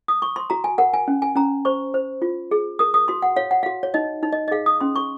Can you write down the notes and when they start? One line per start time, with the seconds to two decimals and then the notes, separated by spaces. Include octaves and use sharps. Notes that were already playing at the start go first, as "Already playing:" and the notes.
0.08 D#6
0.22 C#6
0.36 C6
0.50 F#4 A#5
0.64 G#5
0.78 A#4 F#5
0.94 G#5
1.08 C#4
1.22 G#5
1.36 C#4 A#5
1.65 C5 C#6
1.94 C5
2.22 F4
2.51 G#4
2.79 A#4 D#6
2.94 D#6
3.08 F#4 C6
3.22 F#5
3.36 C#5 F5
3.51 F#5
3.63 F#4 F5
3.83 C#5
3.94 D#4 D#5
4.23 D#4
4.32 D#5
4.48 D#5
4.51 G#4 F5
4.66 D#6
4.81 C#4 C6
4.96 C#6